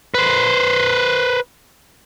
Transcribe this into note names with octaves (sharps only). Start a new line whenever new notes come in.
B4 C5